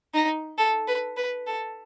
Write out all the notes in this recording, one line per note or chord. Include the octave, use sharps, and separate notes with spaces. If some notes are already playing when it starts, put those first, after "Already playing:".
D#4
A4
B4
B4
A4